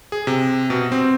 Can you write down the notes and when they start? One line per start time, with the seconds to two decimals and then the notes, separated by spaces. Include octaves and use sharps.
0.12 G#4
0.27 C3
0.70 B2
0.92 C4